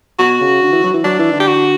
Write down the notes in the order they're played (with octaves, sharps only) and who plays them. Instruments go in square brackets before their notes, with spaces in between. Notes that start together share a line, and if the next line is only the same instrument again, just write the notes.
[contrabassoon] B2 [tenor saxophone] F#4
[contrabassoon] C#3
D3
E3
F#3
E3
[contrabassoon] F#3 [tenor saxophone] D4
[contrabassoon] E3
D3
[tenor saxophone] G4
F#4